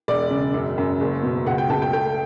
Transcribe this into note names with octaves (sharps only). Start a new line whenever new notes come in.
E1 D5
C#3
F#2
F#2
F#1
B2
C#2 F#5
G5
C#2 A5
G5
A3 G5